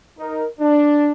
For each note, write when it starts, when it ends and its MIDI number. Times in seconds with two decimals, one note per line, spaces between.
0.19 0.46 63
0.19 0.46 70
0.60 1.11 62